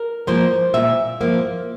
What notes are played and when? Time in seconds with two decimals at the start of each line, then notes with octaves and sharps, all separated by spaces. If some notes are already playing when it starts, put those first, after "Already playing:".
Already playing: A#4
0.27 F3 A#3 C5
0.74 A#2 E5
1.21 F3 A#3